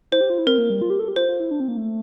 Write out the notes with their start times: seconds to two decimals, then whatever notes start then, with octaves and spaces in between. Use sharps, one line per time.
0.12 E4 C5
0.21 G4
0.30 F4
0.38 E4
0.47 C4 A#4
0.58 A#3
0.70 G3
0.82 F4
0.90 G4
0.99 A4
1.08 G4
1.16 F4 C5
1.28 F4
1.40 E4
1.51 D4
1.60 C4
1.68 A#3
1.77 A3